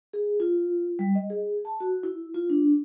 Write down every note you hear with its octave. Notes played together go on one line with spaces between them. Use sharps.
G#4
F4
G3
D#5
G#4
A5
F#4
E4
F4
D4